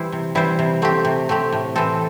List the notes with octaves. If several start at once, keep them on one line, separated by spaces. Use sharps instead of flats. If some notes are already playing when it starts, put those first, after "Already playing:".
Already playing: E3 G3 E4 C5
C3
E3 G3 E4 C5
C3
A3 C4 G4
C3
A3 C4 G4
A2
E3 C4 A4